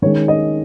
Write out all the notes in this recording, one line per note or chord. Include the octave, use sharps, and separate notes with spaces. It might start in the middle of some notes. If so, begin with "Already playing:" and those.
D#3 G#3 C#4 C#5
D#5